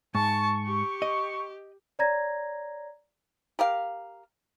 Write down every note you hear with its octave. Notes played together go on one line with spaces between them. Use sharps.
G#2 A5 C#6
G4
D#5
C#5 D5 A#5 G#6 A#6
G4 A#4 F5